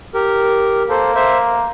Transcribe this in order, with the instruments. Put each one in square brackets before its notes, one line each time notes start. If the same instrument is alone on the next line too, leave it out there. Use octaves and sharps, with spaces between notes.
[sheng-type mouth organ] G4 A#4
[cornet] A#3 [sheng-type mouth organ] A4 C5
[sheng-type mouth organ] C5 E5